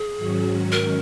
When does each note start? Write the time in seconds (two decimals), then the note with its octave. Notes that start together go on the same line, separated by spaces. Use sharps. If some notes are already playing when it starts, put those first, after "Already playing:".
Already playing: G#4
0.16 G#2 D#3 F#3 C#4 F#4
0.72 A#4